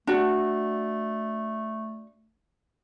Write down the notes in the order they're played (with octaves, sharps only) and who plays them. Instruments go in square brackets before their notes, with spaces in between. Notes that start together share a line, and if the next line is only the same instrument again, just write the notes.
[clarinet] A3 [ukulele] D4 F#4